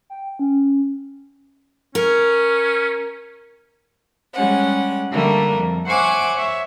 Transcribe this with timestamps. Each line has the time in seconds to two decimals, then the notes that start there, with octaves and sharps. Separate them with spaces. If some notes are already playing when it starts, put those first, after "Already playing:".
0.10 G5
0.39 C#4
1.95 C#4 A#4
4.34 G3 G#3 C#4 F#5
5.10 D3 G3 A3 A#3
5.55 F2
5.85 C5 C#5 E5 F#5 G#5 D6
6.34 C#5 E5